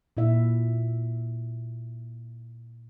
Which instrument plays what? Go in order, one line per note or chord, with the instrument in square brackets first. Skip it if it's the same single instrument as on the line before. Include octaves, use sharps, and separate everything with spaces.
[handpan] A#2 E4 E5